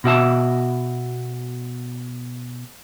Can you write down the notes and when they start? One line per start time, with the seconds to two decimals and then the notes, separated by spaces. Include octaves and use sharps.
0.04 B2 F#4 E5 A5